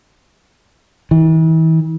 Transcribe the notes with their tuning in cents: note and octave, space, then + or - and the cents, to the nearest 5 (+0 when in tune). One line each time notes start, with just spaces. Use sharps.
E3 -40